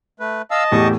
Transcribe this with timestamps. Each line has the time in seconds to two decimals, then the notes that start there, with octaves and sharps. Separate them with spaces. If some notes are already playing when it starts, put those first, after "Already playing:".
0.20 A3 B4
0.51 D#5 F5 A5 E6
0.72 E2 A2 G4 C#6 D#6